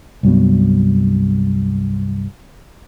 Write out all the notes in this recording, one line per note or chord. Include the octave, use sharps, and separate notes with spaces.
C2 G2 F#3 B3